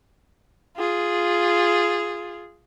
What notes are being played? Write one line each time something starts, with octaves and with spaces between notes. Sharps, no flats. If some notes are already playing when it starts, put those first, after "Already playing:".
F4 G#4